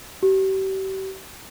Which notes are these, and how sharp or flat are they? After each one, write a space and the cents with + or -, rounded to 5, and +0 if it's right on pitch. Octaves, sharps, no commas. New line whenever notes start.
G4 -40